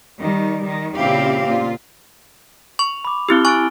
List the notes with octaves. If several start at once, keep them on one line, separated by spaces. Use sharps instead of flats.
D#3 G3
D#3
A#2 C#3 C4 E4 G4 F5
A#2 F4
C#6 F7
B5 D6
C4 E4 G4 E6 F6 G7
G#5 C#6 F#6 A6 D7